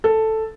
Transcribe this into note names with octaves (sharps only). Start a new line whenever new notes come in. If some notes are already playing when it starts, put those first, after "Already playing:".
A4